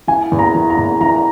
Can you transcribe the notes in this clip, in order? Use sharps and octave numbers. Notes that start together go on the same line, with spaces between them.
E3 G#5
E2
A#5
E3
A#5
E2
E3 A#5